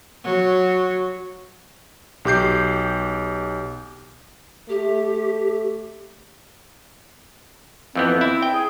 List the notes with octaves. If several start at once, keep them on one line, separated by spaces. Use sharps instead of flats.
F#3
B1 G4 D6 G6 C7
A3 G4
F2 E3 B3 C4
E4
G5
G#4